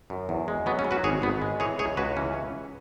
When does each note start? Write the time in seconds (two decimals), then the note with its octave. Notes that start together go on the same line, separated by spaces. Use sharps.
0.10 F#2
0.29 E2
0.48 G#3
0.66 F#3 B3
0.79 C#4
0.85 F#3
0.91 F#4 B4
1.04 G#1 G#4 C#5
1.22 G#1 B3
1.42 G#3
1.60 E3 G#4 C#5
1.79 C#2 G#4 C#5
1.97 C#2 F#4 B4
2.17 E3 C#4